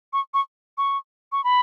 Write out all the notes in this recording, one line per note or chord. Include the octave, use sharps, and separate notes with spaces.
C#6
C#6
C#6
C#6
B5